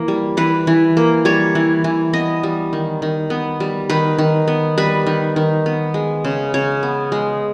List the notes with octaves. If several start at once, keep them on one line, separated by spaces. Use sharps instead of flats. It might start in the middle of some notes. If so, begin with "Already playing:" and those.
Already playing: E3 A#3
G3
E3 B4
E3
A#3
G3 C#5
E3
E3
B3 D#5
G3
D#3
D#3
B3
G3
D#3 B4
D#3
B3
G3 B4
D#3
D#3
B3
G#3
C#3
C#3 C#5
B3
G#3